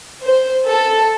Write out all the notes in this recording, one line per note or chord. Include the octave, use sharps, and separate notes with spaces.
C5
A4